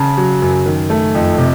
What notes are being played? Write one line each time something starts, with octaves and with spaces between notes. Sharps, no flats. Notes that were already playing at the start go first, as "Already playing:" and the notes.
Already playing: C#3 A5
F#3
F#2
D#3
A3
F2
C3